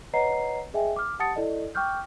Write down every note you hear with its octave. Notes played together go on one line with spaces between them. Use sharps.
B4 C#5 D#5 F#5 A#5 C7
G#4 D#5 E5 G5 G#5
D6 F6
G4 F#5 A5 D#6 A6 C#7
E4 A4 D5 D#5
G5 C#6 D6 F6 G6